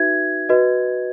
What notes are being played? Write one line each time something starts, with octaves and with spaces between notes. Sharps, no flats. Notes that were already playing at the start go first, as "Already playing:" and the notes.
Already playing: D#4 F#4 B4 E5 G#6
F#4 B4 D#5